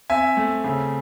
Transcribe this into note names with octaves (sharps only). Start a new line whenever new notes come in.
C4 E5 G#5
A3
C#3